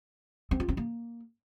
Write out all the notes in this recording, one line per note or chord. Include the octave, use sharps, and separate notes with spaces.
C4
F4
C4
A#3